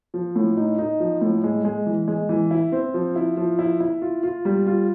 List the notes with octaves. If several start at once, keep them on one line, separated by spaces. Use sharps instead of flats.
F3
A2
D#4
D#4
F3
A2
G#3
G#3
E3
G#3
E3
E4
C4
F3
E4
F3
E4
E4
F4
F4
G3
F4